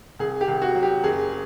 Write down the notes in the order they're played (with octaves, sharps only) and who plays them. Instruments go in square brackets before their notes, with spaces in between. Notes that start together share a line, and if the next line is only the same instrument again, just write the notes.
[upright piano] C2 G#4
G4
C2
F#4
F#3
G4
F#1 G#4